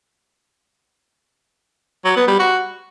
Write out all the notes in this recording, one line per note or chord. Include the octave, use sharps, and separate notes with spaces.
F#3
B3
G3
F#4